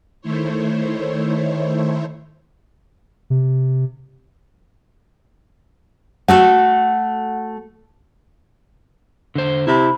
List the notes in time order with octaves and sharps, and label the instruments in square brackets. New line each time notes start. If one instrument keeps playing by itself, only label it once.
[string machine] D#3 A3 E4 C5 C#5
[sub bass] C3
[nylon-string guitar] A3 F#4 A4 [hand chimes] F#5
[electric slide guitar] D3 C5
[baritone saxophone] C3 [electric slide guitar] E4 [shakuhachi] B5